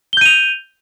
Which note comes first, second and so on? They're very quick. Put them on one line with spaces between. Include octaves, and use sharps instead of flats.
G7 G6 D#7 F7